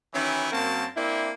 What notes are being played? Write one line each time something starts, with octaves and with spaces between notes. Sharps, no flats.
D#3 E3 F#3 C#4 E4
F#2 F#3 A#3 C4 A5
A#3 C4 D4 E4